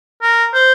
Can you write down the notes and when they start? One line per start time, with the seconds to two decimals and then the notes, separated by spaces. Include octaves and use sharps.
0.22 A#4
0.53 C5